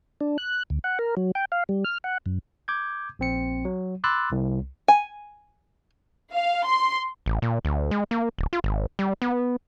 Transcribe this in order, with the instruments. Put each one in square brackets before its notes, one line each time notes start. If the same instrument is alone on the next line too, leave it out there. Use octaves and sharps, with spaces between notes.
[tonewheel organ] D4
F#6
D2
F#5
A#4
F#3
G5
F5
G3
F6
F#5
F#2
[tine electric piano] D6 G6 G#6
A#1 C4 C#7
F#3
B5 C6 D6 E6 F#6 A6
C2
[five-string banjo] G#5
[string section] F5
C6
[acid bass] A1
A#2
D2
G#3
A#3
D1
F4
G#1
G3
B3